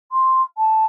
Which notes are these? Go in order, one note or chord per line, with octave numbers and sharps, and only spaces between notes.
C6
A5